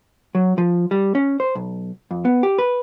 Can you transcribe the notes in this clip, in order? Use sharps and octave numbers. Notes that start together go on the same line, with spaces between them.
F#3
F3
G3
C#4
C5
B1
F2
B3
G4
B4